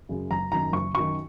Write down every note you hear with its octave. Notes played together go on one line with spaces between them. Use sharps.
F#2 C#3
F#1 A#5
F#2 D#3 A#5
F#1 C#6
F#2 D#3 C#6